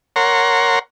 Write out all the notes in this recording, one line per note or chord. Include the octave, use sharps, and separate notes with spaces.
A#4 C#5 F#5 A#5 C6